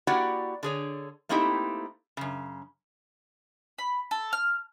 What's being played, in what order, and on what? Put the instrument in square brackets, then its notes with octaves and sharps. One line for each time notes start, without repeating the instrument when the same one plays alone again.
[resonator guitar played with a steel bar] A#3 E4 F#4 G4 D5 F#5
D3 G#4 C#5
A3 A#3 C4 D#4 E4 G4
F#2 C#3
[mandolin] B5
A4
F6